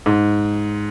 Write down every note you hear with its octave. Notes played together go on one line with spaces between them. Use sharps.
G#2